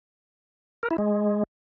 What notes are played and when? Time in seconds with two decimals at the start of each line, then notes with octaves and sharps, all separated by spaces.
0.83 A#4
0.91 E4
0.98 G#3